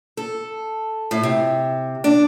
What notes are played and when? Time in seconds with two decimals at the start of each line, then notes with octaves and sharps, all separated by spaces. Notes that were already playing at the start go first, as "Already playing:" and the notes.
0.17 A4
1.11 A2
1.23 C3
2.04 D4